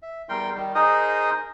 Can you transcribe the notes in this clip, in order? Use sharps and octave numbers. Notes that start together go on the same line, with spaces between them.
E5
E2 G3 A#4 G5 C6
D#3 G3
D#4 G#4 A#4 C5 D#5 D#6